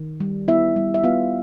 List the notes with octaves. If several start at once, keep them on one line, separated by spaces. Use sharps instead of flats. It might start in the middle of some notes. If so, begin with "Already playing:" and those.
Already playing: D#3
G3
B3 E4 E5
G3
E5
B3 F4 F5